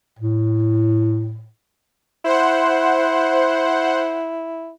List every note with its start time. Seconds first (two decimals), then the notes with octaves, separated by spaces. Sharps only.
0.19 A2
2.25 E4 C5 F#5